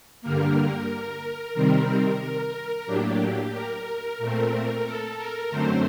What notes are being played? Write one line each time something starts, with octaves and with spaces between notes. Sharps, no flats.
G2 D3 G3 A#3 A#4
C3 D#3 G3 C4
A#4
A2 F#3 A#3 D4 G4
A#4
A#2 A3 C4
A4
A#4
F#2 D3 F#3 A3 C4 C5